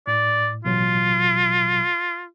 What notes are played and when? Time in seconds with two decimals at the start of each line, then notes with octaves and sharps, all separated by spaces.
0.07 A2 D5
0.65 A1 B2 F#3 F4